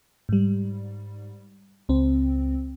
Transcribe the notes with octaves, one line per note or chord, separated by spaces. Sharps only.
G#2 G3
C#2 C4